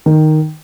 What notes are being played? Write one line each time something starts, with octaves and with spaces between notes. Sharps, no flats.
D#3